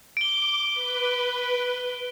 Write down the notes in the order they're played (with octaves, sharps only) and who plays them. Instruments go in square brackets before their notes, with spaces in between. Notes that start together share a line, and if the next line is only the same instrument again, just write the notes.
[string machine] D6 [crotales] D7 G7
[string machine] B4